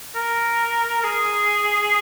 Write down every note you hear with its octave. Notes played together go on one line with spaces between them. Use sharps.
A#4
G#4